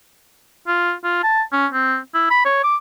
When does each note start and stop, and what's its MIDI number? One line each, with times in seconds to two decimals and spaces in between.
0.68 0.93 65
1.04 1.23 65
1.23 1.42 81
1.52 1.67 61
1.72 1.97 60
2.14 2.29 64
2.30 2.43 83
2.45 2.61 73
2.64 2.76 86